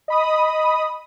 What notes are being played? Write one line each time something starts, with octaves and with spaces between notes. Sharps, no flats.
D#5 B5 D#6